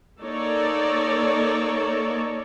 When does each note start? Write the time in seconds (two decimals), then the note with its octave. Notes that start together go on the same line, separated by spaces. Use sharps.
0.20 A#3 D#4 A4 C#5 D5